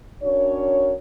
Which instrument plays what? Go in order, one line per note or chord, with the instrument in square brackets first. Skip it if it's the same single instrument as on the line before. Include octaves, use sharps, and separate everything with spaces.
[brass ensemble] C#4 D4 F#4 A#4 C#5